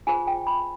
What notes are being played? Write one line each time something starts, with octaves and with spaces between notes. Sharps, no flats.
F4 G#4 C5 G#5
G5
B5